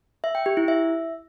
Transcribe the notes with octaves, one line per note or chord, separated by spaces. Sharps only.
E5
G5
G4
E4
E5